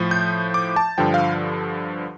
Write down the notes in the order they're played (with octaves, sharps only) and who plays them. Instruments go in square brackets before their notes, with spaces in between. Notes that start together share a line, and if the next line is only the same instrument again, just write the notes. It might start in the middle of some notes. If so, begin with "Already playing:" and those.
Already playing: [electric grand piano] A2 F3
G6
D6
A5
G2 D3 F3 G5
F5